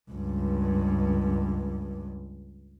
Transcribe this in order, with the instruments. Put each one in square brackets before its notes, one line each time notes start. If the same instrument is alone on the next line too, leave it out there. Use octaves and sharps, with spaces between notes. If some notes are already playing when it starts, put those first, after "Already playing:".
[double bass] C#2 G2